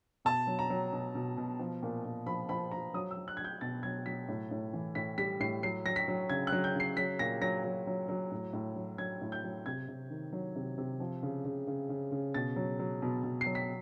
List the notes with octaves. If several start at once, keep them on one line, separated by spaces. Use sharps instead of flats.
B2 A5
F#3
A#5
F#3
B2
B2
B2
F3
A#2
A#2
F3 B5
F3 B5
F3 A#5
F#3 D#6
E6
F#3
F#6
F#3 G#6
G6
B2 A6
F#3 G#6
F#3 B6
A2
A2
E3
A2 B6
G3 B6
A2 C7
F#3 C7
F#3 A#6
B6
F#3
C#3 G#6
F#6
F#3
G6
C#3 C7
F#3 B6
A#2 A#6
F#3 A#6
F#3
F#3
F#3
A2
A2
F#3
F#3 G#6
A2
G6
F#3
C3 G#6
C3
D#3
F#3
C3
C3
F3
C#3
C#3
C#3
C#3
C#3
B2 A6
F#3
F#3
B2
B2
F#3 C7
B6